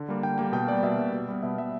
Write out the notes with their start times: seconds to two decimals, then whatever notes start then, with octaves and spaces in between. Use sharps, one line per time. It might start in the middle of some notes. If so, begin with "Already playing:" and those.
Already playing: D3
0.09 G3 A#3
0.23 D3 G5
0.38 G3 A#3 G5
0.53 B2 G5
0.67 G3 A#3 D5
0.83 B2 E5
0.98 G3 A#3
1.13 B2
1.28 G3 B3
1.43 B2 E5
1.58 G3 B3 E5